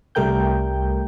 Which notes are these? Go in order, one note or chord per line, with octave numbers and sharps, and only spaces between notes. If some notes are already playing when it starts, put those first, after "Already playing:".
C2 G3 A3 A#4 G5 G6